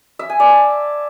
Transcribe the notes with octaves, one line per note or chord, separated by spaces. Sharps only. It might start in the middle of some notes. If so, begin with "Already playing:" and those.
E5
G#5
D5
A5